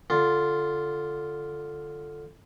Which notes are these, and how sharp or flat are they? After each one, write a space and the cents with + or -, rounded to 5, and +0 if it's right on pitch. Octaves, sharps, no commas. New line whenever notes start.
D3 +0 F4 +0